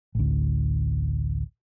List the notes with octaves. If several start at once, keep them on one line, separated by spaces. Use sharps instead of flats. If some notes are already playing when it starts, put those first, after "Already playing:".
A1 D2